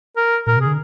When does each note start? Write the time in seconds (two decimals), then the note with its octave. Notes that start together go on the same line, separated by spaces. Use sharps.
0.17 A#4
0.47 A#2 A#4
0.57 C3 G#4
0.66 D3